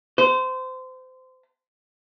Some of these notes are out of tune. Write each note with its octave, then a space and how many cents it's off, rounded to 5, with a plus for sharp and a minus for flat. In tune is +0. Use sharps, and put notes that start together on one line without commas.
C5 -25